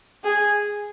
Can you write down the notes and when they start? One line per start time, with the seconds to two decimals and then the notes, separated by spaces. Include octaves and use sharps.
0.24 G#4